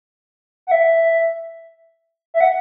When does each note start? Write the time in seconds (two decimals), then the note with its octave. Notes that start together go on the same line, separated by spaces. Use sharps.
0.67 F#5
0.71 E5
2.34 E5
2.41 F#5